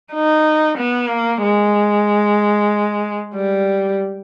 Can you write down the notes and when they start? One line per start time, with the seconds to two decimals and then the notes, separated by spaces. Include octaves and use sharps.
0.14 D#4
0.78 B3
1.10 A#3
1.42 G#3
3.35 G3